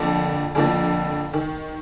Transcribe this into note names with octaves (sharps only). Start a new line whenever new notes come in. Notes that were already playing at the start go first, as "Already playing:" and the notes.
Already playing: F2 D3 F3 A#3
F2 D3 F3 A#3
D#3